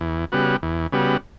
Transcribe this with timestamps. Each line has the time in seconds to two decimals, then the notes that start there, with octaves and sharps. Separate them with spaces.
0.01 E2
0.32 C#3 G3 B3 F#4
0.63 E2
0.92 C#3 G3 B3 F#4